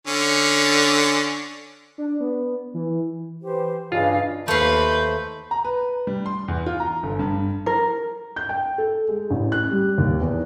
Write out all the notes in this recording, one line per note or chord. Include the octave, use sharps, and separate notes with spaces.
D3 C#4
D4
B3
E3
E3 G4 C5
G2 C#3 D4 F4 G#4 C#5 D#5 F5
D#2 A3 B4 C5 F5 G6
A#5
B4
G3
C6
E2
F4
A#5
G1
G2
A#4
G6
G5
A4
G#3
A1
F#6
G3
D#2
E2